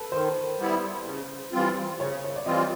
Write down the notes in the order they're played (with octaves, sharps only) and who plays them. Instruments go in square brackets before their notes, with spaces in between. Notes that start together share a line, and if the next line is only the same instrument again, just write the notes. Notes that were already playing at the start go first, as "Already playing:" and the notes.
Already playing: [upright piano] A4 B4
[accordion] D#3 [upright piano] C5
[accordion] G3 B3 E4
C#3
E3 G3 C4 F4
[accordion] C#3 [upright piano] C#5
[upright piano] C#5
D5
[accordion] E3 G3 C4 F4 [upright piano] D#5